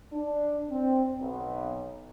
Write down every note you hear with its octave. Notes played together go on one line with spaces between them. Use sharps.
D4
C4
B1